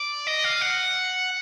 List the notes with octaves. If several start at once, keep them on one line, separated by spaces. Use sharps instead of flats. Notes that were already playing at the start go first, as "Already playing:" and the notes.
Already playing: D5
D#5
F5
F#5